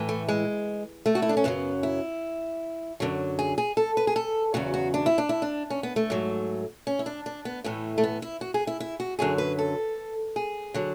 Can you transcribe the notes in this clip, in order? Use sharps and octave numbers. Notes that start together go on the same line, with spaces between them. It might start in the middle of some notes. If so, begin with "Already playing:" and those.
Already playing: A2 E3
A3
G#3
A3
F#4
E4
D4
C#4
F#2 C#3 F#3 B3
E4
F#2 D3 F#3
G#4
G#4
A4
B4
G#4
A4
E2 C#3 F#3 F#4
F#4
D4
E4
D4
E4
D4
C#4
B3
A3
G#2 F#3
C#4
E4
D4
D4
B3
A2 E3 A3
A3
B3
E4
F#4
G#4
E4
E4
F#4
F#2 D3 F#3 G#4
B4
A4
G#4
D3 F#3